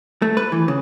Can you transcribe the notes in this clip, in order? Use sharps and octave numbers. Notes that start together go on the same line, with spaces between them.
A3
B4
E3
C#3